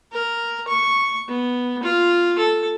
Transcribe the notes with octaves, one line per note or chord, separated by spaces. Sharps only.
A#4
C#6
B3
F4
A4